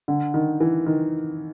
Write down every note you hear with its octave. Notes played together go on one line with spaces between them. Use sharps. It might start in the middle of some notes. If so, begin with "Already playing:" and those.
D3
D#3
E3
D#3